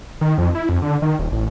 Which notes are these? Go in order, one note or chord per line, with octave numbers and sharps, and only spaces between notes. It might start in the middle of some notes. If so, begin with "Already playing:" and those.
D#3
F2
E4
F2
D3
D#3
D#1
A1